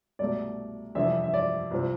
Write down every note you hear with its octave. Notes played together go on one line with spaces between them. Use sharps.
C2 B2 A3 D5
F2 C3 E3 G3 D4 E5
E5
D5
C2 C3 F3 C4